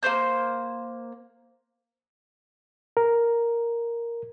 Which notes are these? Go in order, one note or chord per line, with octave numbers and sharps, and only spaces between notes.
A#3 C4 C5 G6
A#4